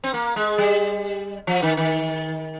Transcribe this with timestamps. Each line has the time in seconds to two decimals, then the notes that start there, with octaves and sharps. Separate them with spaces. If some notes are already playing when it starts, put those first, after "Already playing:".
0.04 C4
0.14 A#3
0.36 G#3
0.58 G3
1.47 F3
1.62 D#3
1.77 D#3